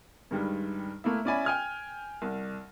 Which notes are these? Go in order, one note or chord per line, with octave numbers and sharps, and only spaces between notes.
G2 D#3 G3 G#3
A3 A#3 E4 E5
C#4 E4 D5 E5 G#5 B5
G5 G#5 F6 G#6
C2